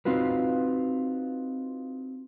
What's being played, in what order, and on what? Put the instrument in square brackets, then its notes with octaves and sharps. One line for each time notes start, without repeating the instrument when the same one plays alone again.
[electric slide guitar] C4 D#4 F4 F#4 B4